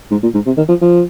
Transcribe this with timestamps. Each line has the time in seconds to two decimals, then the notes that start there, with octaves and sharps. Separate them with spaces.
0.11 G#2
0.23 A#2
0.34 G#2
0.46 C3
0.57 D#3
0.69 F3
0.81 F3